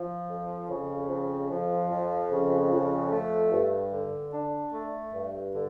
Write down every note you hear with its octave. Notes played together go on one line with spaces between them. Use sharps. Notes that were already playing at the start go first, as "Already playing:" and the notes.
Already playing: F3
F2
C#3
F2
F3
F2
C#3
F2
A3
G2
D3
D4
A3
G2
D3